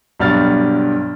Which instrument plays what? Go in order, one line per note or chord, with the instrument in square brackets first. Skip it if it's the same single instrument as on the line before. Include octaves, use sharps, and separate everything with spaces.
[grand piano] B1 G2 F#3 F6 A6